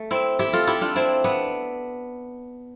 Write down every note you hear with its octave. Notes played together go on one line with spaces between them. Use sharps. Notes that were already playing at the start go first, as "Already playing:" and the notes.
Already playing: A3
C4 E4
E4 G4
F4 A4
E4 G4
D4 F4
C4 E4
B3 D4